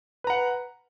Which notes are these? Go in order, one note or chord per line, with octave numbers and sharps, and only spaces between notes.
B4 F#5 A#5